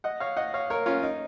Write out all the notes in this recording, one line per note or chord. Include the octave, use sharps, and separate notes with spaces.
D#5 F#5
C#5 F5
D#5 F#5
C#5 F5
A#4 C#5
C#4 F4
D#4